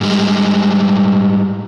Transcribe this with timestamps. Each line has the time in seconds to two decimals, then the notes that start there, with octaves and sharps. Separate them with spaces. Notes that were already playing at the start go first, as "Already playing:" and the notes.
0.01 G#2 G3 G#3